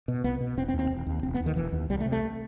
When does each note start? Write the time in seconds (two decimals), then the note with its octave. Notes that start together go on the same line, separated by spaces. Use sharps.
0.08 B2
0.24 C2 B3
0.41 B2
0.57 E1 C4
0.68 C4
0.74 D#2
0.79 C4
0.90 E1
1.06 D#2
1.23 E1 C4
1.34 B3
1.40 D#2
1.46 D#3
1.56 E1 E3
1.72 D#2
1.90 C2 G3
2.00 A3
2.06 C3
2.12 A3